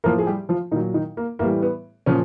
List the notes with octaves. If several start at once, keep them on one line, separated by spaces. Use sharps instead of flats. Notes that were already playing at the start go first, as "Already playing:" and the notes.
A2 F3 A#3 A#4
G#4
G3 G4
F3 F4
A#2 D#3 F#3 D#4
D#3 D#4
A#3
A2 E3 G3 A#3
B3
A#2 C#3 F3 C#4